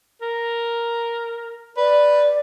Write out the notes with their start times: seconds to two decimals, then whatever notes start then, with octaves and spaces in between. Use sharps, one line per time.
0.22 A#4
1.77 B4 D5